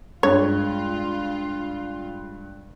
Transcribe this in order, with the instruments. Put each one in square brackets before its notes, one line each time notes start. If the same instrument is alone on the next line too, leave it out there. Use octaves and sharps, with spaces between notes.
[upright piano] G2 [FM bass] G#3 [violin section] F4 [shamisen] C#5